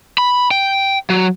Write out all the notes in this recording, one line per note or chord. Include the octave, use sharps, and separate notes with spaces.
B5
G5
F#3